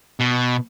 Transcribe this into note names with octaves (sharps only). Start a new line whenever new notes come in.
B2